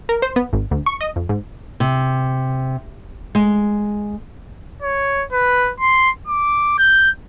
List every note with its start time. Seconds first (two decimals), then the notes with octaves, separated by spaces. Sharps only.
0.09 A#4
0.22 C5
0.36 B3
0.53 G#1
0.71 D2
0.86 C#6
1.01 D#5
1.16 F2
1.29 G#2
1.80 C3
3.35 G#3
4.82 C#5
5.33 B4
5.80 C6
6.27 D6
6.79 G6